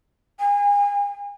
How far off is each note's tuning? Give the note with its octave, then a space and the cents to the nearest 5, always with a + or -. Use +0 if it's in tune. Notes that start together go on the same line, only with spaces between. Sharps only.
G#5 -35